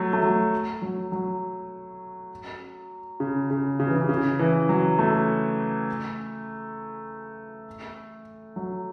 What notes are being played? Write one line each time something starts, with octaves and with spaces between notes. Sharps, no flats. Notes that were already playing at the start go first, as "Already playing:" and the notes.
Already playing: F#3 A3
A3
F#3
F#3
F#3
C#3
C#3
C#3
E3
C#3
C#3
E3
F#3
A3
F#3